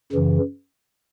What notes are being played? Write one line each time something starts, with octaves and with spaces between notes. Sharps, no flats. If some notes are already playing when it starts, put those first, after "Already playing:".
F#2 C#3 E3